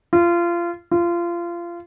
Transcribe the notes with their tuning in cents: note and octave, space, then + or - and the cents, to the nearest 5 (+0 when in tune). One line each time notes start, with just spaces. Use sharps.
F4 -25
F4 -25